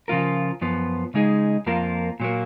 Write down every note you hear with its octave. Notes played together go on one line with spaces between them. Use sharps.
C#3 F3 B3 F4 A#4
F#2 F3 B3
C#3 G#3 D#4 G#4
F2 F3 A#3 F4 A#4
A#2 F#3 A#3